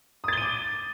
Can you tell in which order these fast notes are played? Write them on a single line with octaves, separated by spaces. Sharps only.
D#6 A6 G7 D#7 D6